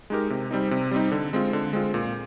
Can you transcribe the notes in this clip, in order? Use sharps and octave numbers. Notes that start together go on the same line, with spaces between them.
G#3 D#4 G4 A#4
C3
G3 C4 D#4
C3
G3 C4 D#4
D3
G#3 C4 F4
D3
G#3 C4 F4
A#2